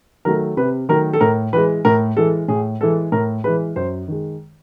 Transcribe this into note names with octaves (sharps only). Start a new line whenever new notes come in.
D#3 F#3 A3 A#4
C3 B4
D#3 F#3 A3 A#4
A4
A2 A#4
E3 G#3 B4
A2 A#4
E3 G#3 A4
A2 G#4
E3 G#3 A4
A2 A#4
E3 G#3 B4
F#2 C5
D#3 G#3